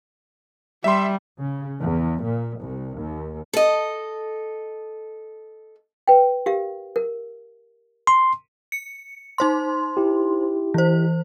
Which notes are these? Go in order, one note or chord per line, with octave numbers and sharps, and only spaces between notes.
G3 E5 C6
C#3
E2
A#2
C2
D#2
A4 D#5
B4 G5
G4 A#4 F5
A#4
C6
C#7
D#4 C5 C6
E4 G4
E3 C5